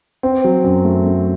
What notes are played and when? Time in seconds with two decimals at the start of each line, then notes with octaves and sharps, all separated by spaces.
0.23 C4
0.44 F#3
0.64 F#2
0.85 A3
1.06 A3